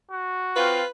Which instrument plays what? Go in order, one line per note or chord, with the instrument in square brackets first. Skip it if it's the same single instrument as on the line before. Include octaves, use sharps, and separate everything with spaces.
[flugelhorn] F#4
[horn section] C4 F4 [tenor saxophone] B4